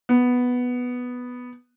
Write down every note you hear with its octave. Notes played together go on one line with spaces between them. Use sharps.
B3